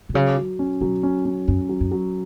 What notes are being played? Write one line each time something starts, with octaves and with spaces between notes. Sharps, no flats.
B2
C#3 F#3
F#3
C#4
B2 F#3
C#4
C#4
F#2 C#4
F#3
F#2
F#3